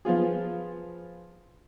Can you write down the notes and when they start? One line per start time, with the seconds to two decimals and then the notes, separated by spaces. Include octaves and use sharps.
0.05 F3 B3 F4 G#4